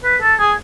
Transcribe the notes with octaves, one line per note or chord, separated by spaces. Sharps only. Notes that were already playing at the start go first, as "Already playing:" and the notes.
B4
A4
G#4